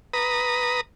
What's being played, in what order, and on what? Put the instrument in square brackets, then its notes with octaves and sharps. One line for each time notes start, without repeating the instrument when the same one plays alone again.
[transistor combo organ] B4 A#5 D#6